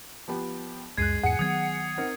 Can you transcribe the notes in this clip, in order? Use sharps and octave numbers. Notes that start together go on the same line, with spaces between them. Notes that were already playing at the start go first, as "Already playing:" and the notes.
F3 B3 G4
C#2 F#2 G#3 F#6 G#6 C7 D#7
E2 G#2 G#4 F#5 G#5 C#7
D#3 F#3 B3 D#6 G#6
C4 D#4 A#4